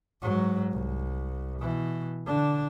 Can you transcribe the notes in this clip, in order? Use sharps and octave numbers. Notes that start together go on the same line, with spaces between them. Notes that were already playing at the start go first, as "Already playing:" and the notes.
G#2 F#3
C2
B2 E3
D3 D4